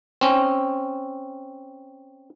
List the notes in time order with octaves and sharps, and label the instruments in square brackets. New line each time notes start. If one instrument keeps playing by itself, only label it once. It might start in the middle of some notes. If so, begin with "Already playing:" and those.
[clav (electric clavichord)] C4 C#4